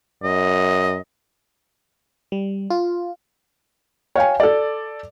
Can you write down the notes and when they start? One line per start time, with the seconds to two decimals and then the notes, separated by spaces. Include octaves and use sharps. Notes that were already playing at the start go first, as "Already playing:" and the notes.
0.23 F#2 D#5
2.32 G3
2.70 F4
4.16 C#5 F5 G5 G#5
4.40 A4 D5